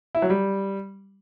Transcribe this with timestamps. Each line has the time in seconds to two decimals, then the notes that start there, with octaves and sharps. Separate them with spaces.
0.15 E4
0.22 F#3
0.30 G3